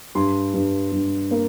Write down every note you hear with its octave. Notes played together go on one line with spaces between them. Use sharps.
G2 C6
G2
G2
A#3